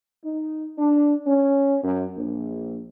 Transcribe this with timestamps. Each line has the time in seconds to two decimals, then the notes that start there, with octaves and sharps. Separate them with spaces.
0.24 D#4
0.78 D4
1.26 C#4
1.84 F#2
2.17 A#1